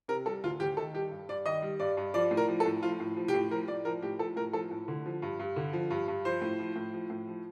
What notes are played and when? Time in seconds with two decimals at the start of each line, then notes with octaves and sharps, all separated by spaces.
0.08 C3 A#4
0.26 G3 A4
0.44 D2 F4
0.60 D2 G4
0.77 D#3 A4
0.94 G3 G4
1.11 G2
1.29 G2 D5
1.46 D#3 D#5
1.62 G3
1.80 G2 D5
1.97 G2
2.14 F3 D5
2.31 A2
2.37 A#4
2.48 F3
2.60 A4
2.66 A2
2.83 F3 F4
3.00 A2
3.17 F3
3.28 G4
3.34 A2
3.51 F3 A#4
3.68 A2 D5
3.85 F3 A#4
4.02 A2 G4
4.19 F3 A4
4.36 A2 A#4
4.53 F3 A4
4.71 A2
4.88 D3
5.06 F3
5.22 G2
5.39 G2
5.56 D3
5.73 F3
5.90 G2
6.08 G2
6.25 F3 C5
6.42 A2
6.59 F3
6.76 A2
6.94 F3
7.10 A2
7.28 F3